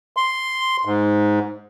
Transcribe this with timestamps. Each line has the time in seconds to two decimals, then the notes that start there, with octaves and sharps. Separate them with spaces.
0.17 C6
0.85 G#2